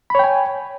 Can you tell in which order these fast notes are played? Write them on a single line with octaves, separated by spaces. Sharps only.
B5 C#5 G5 G#5